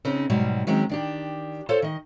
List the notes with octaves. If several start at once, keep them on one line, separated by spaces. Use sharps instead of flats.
C#3 C4 C#4 D#4
G#2 B2 F#3 G3
D#3 F#3 G#3 C4 C#4
D#3 D4 G4
F4 A4 C5 C#5
D#3 D#5